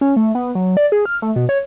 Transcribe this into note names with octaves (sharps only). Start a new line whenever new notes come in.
C#4
A3
B3
F#3
D5
G#4
F6
A3
B2
C#5